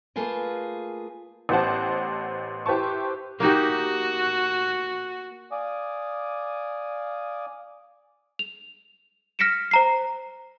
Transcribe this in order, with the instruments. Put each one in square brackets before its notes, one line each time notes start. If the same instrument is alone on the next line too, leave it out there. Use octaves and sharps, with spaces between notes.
[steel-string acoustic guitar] A3 A#3 F4 G#4 B4
[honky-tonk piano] A1 B3 G4 C5 F#5 A5
E4 G4 B4 C5 A5 C#6
[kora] A#3 D#4 G4 [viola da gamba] F#4
[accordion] D5 F5 G#5 D6 D#6
[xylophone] F7
F6 A#6 B6 C#7 D7 E7
C5 A#5 C7